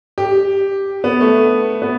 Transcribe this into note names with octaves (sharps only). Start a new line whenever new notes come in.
G4
B3
A3
B3